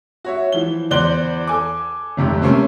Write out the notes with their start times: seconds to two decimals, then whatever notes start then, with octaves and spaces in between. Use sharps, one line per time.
0.25 F#4 C#5 E5
0.52 E3 F3 G7
0.91 E2 C5 D5 F#6 G7
1.47 A4 G#5 D6
2.17 G#1 F2 C3 A3
2.42 C3 F3 A3 A#3 C4 C#4